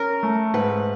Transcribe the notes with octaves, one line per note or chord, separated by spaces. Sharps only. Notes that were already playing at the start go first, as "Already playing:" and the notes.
Already playing: C#4 A#4
A3
G#2 B4